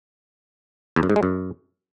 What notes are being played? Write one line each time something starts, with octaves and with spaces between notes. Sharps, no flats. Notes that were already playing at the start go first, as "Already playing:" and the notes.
E2
F#2
G#2
G#3
F#2